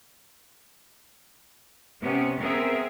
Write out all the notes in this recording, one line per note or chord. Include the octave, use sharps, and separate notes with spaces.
C3 B3 C#4
B3 C4 G#4 A#4 E5